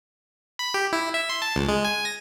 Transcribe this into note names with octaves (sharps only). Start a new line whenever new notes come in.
B5
G4
E4
E5
C6
A5
C#2
G#3
G#5
A#6